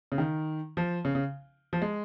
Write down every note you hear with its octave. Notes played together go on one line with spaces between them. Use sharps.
C#3
D#3
F3
C#3
C#3
F3
G#3